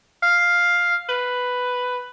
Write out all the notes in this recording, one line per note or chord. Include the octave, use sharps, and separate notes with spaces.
F5
B4